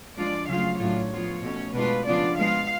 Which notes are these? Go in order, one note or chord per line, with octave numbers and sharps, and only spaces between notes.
F3 G#3 D4 F4 D5
C#3 F#3 A3 C#4 F4 F5
A2 F#3 A3 D4 F4 C#5
F3 B3 F4
B2 A3 C#4
B2 G#3 D4 F4 B4
C#3 F3 B3 D4 F4 D5
F3 G#3 B3 F4 F5